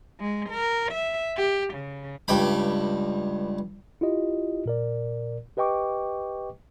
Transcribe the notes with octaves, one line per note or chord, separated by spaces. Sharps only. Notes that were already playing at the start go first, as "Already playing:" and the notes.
G#3
A#4
E5
G4
C#3
C#2 G2 G5 B5
E4 F4 G4 D#5
A#2 A#4 D5
G4 B4 D#5 G5 C#6 D6